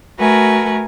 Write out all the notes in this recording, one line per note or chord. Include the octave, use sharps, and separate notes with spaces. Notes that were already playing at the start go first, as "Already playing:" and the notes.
A3 F#4 A#4 B4 G#5